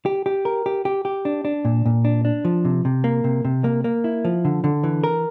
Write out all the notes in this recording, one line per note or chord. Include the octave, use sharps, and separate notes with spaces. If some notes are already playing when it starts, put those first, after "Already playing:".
G4
G4
A#4
G4
G4
G4
D4
D4
A#2
A#2
D4
D4
F3
C3
C3
A#3
C3
C3
A#3
A#3
E4
F3
D3
D3
E3
A#4